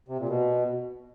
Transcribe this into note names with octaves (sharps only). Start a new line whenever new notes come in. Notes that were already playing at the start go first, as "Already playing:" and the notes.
C3
A#2
B2